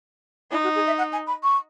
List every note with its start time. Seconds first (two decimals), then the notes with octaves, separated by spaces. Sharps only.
0.51 D#4 E4
0.63 F#4
0.75 G#4
0.86 E5
0.97 F#5
1.12 G#5
1.26 B5
1.43 C#6